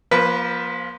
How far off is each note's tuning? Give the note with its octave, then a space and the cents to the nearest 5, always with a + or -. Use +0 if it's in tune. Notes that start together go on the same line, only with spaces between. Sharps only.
F3 +0 A#3 +35 B4 +0